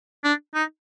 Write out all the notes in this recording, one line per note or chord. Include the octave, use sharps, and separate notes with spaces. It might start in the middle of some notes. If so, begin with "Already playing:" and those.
D4
D#4